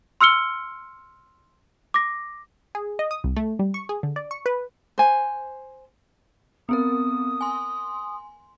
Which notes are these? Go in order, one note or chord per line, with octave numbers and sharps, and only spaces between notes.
C6 E6 F6 C#7 G7
D6 A#6
G#4
D#5
D#6
C2
A3
G3
C#6
G#4
D3
D5
C#6
B4
C5 G#5
B3 C4 A#4 D#6
G#5 C6